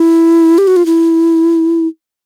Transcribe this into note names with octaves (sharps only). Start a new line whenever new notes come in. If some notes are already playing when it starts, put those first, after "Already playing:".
Already playing: E4
G4
F#4
F4
E4